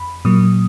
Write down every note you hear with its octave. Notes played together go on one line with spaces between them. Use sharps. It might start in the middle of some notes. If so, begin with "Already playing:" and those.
Already playing: F2 B5
A#2 F#3 A#3 D#6